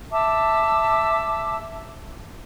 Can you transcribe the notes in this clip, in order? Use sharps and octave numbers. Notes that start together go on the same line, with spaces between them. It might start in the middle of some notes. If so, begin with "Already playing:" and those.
E5 A5 D6 E6